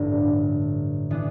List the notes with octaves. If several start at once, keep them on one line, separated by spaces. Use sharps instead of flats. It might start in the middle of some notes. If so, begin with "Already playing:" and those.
Already playing: A1 G2 D3
E3 B3 D4